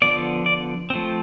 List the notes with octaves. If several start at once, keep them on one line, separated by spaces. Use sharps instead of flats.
D3 F3 B3 D5
D5
F3 A3 C4